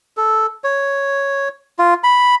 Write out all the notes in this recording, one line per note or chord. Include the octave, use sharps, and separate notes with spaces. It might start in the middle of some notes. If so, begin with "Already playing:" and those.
A4
C#5
F4
B5